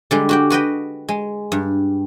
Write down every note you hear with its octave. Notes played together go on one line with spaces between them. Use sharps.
D3 G3 G#3
F#4 G4 G5
F#4 B4 D#5 G5
G#3
G2